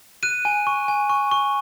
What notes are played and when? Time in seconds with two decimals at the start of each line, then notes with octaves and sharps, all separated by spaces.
0.23 F#6 D#7
0.45 G#5
0.67 C#6
0.88 G#5
1.10 C#6
1.31 C#6